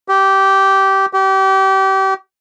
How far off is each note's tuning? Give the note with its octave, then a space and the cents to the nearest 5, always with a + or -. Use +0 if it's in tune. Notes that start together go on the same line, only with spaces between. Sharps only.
G4 -15
G4 -30